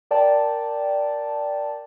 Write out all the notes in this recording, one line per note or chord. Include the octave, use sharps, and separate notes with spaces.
A#4 D5 G5 A5